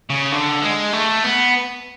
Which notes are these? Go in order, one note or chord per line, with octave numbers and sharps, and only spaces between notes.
C#3
D3
G#3
A3
B3